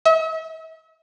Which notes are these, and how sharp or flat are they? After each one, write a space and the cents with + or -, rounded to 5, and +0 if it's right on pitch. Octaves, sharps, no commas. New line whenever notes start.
E5 -40